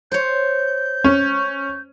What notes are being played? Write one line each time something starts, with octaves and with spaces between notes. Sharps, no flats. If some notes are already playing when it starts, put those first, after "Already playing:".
C5 C#5 G6
C#4